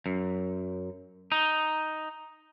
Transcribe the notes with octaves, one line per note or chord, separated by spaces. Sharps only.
F#2
D#4